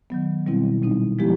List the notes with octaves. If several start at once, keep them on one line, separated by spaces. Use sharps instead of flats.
D#3 F#3 B3
B2 G3 C4 E4
A#2 G3 C4 D#4
F3 G#3 B3 E4 G4